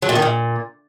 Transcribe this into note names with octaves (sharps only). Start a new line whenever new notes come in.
F#3
A#2
D#3
A#2